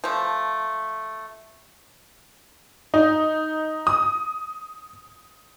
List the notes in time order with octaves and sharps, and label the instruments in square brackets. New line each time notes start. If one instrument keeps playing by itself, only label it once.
[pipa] F3 A3
[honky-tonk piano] D#4
D#6